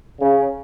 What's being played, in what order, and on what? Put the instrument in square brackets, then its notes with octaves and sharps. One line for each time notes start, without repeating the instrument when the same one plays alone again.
[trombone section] C#3